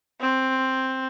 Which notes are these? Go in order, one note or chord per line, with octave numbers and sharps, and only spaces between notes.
C4